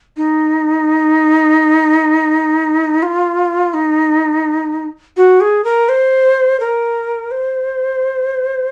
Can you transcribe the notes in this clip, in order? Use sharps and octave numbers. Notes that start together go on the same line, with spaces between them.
D#4
F4
D#4
F#4
G#4
A#4
C5
A#4
C5